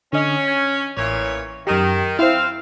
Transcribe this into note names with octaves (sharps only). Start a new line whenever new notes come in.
D3 C#4 D#5
G#6
A1 A#2 E3 C#5
F#2 D#3 G4
C4 E4 C5 F5